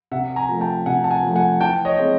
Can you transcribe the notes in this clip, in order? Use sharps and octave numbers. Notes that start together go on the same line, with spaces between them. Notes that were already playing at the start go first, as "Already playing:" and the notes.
C3 E5 F#5
G#5 A#5
F3 A3
G5 A5
C3 F#5 G#5
A5
F#5 G#5
F3 A3
F#5 G#5
E3 G5 A5
C#5 D#5
G#3 C4